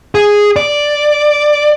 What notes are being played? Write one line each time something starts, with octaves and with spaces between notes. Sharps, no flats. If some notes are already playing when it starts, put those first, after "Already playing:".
G#4
D5